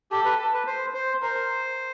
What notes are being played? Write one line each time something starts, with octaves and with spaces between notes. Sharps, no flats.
G4 A4
B4
B4
C5
C5
A#4 C5